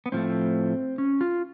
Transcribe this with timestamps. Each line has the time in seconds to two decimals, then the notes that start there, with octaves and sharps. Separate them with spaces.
0.06 B3
0.12 A2 F3 A3 C4
0.98 C#4
1.21 F4